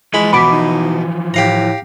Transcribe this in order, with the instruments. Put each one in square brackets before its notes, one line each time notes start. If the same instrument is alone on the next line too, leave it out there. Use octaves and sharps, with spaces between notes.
[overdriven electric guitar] E3 F3 [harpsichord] G#3 B5
[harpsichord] B2 [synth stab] B5 D6
[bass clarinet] D#4
[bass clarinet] A2 [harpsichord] G4 F5 A#5